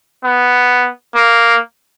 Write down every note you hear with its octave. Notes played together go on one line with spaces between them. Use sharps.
B3
A#3